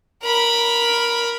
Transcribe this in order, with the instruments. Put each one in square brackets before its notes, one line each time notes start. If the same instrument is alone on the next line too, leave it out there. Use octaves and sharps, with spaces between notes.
[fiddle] A#4 B5